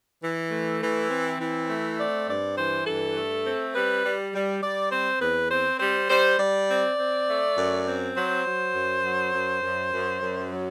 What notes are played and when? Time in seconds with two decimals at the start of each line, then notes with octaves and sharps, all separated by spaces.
0.22 E3
0.51 A3
0.81 E3
1.10 C4
1.40 E3
1.69 A3
1.99 C4 D5
2.28 G2 D5
2.57 E3 C5
2.86 G2 A4
3.16 A3
3.45 C4
3.74 G3 B4
4.04 G3
4.33 G3
4.63 G3 D5
4.92 C4 C5
5.21 E2 B4
5.51 C4 C5
5.80 G3 C5
6.09 G3 C5
6.39 G3 D5
6.68 C4
6.98 C4
7.27 A3
7.56 F#2
7.86 C4
8.15 F#3 C5
8.45 F#3
8.74 F#2
9.03 F#3
9.33 F#2
9.62 F#2
9.91 F#2
10.20 F#2
10.50 F#3